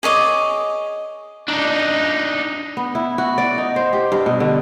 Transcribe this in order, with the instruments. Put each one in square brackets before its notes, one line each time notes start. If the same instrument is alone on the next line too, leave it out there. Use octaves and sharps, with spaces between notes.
[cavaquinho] G#4 C#5 D#5 D6
[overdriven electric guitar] D4 D#4
[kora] B3
E4
F#4
D5
D#4
C5
G4
G2
B2
D3